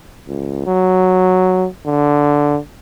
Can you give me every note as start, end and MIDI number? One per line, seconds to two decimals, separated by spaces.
0.28 0.62 37
0.66 1.67 54
1.86 2.58 50